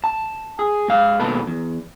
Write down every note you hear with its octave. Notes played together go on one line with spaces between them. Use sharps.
A5
G#4
G#2 F5
D#2 G#2 B2 A4 B4
E2